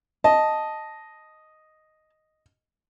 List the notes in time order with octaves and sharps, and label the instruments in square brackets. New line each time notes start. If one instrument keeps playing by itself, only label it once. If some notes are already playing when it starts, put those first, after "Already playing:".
[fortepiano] D#5 [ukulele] A5